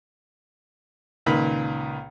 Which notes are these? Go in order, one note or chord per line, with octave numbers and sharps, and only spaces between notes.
C#2 A#2 D#3 B4 B5